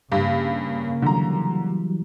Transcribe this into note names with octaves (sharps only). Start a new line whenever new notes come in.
G2 C#3 A#3
D3 E3 F#3 G3 A#5